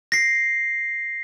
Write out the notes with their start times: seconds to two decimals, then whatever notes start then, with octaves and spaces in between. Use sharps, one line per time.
0.12 A#6 C7